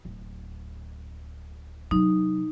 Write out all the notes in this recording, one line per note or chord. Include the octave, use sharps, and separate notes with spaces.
D1
C3 F#3 D#4